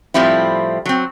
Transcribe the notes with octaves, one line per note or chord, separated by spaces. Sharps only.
A2 F3 G3 C4 E4
F#3 C4